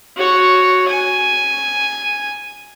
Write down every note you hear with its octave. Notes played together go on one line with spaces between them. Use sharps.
F#4 C#5
G#5